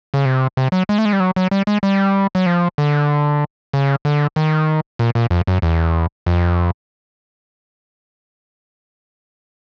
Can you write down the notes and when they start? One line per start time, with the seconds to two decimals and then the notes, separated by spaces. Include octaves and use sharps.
0.14 C#3
0.25 C3
0.57 C3
0.72 F#3
0.89 G#3
0.98 A3
1.05 G#3
1.13 G3
1.20 F#3
1.36 F#3
1.51 G3
1.67 G#3
1.83 G3
2.35 F#3
2.46 F3
2.78 D3
3.73 C#3
4.05 D3
4.36 D#3
4.99 A#2
5.15 A#2
5.30 F2
5.47 F#2
5.62 E2
6.26 F2